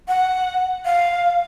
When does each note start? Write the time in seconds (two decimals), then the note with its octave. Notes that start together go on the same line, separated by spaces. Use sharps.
0.08 F#5
0.85 F5